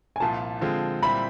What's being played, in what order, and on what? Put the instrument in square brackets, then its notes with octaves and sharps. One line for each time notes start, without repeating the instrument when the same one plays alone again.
[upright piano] G#5
[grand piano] C2 A#2 F3 [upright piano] A5
[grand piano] D3 F3 G#3 C4 F4
[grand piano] A#2 G3 C4 E4 [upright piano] B5